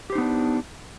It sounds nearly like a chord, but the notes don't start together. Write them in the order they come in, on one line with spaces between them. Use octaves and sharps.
G4 C5 D#4 B3 D4